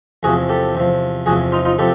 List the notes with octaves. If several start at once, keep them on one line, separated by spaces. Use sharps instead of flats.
E2 C3 F3 F#4 G#4
G4 A4
E2 C3 F3
E2 C3 F3 F#4 G#4
D#4 F4
D#4 F4
C3 F3 G4 A4